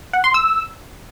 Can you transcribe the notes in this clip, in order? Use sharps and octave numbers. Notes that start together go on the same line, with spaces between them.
F#5
C6
E6